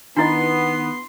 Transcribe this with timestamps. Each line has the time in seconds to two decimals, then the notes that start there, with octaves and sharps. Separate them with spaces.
0.17 D#3 B3 D4 E4 D#5 C6